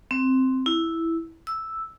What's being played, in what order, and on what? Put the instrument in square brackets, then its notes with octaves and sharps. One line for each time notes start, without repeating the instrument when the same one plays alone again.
[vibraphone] C4
E4
E6